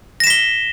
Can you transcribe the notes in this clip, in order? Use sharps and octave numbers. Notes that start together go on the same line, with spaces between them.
A#6 B6 E7 G7